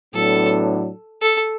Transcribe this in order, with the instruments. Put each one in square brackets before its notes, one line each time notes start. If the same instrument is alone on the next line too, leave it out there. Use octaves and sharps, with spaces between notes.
[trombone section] A2 F#3 B3 D4 [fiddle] A4
[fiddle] A4